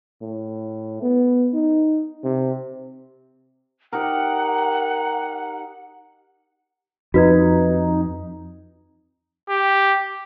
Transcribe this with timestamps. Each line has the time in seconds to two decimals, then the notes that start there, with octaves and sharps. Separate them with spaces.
0.22 A2
1.02 B3
1.54 D#4
2.24 C3
3.93 D#4 G4 A#4 F#5
7.14 F2 D#4 F#4 B4 G#6
9.50 G4